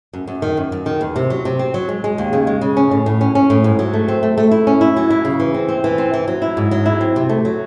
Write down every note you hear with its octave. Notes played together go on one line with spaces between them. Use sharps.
F#2
F#2
D#3
F#2
F#2
D#3
E2
C3
F#3
C3
C4
F#3
G#3
G#3
D#2
C#3
G#3
C#3
C#4
A2
A2
C#4
C#4
A2
G#2
F#3
A3
C4
A3
A3
E4
C#4
E4
F#3
E4
C#3
E3
C4
C4
E3
C4
E3
F#3
E4
G#2
F#3
E4
C4
C3
A3
F#3